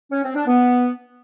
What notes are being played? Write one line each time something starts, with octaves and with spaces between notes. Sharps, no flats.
C#4
C4
D4
B3